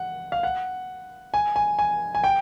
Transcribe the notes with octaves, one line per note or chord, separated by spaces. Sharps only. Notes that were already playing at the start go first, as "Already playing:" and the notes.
Already playing: F#5
F5
F#5
G#5
G#5
G#5
G#5
G5